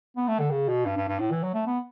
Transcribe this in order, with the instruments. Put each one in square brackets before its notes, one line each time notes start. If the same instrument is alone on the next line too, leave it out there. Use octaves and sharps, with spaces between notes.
[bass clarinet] B3
A3
D3
C#3
B2
G2
G2
G2
A2
E3
F#3
A3
B3